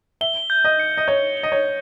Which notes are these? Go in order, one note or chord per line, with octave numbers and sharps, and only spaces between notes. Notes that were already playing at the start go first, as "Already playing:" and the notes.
E5 G7
G6
D#5
C#7
D#5
C#5 G6
G7
D#5
C#5